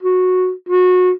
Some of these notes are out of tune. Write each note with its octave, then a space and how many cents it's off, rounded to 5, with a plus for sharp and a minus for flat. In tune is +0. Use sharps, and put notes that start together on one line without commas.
F#4 -10
F#4 -25